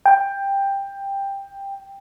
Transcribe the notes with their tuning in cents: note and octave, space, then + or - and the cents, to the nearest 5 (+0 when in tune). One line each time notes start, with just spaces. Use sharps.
G5 +10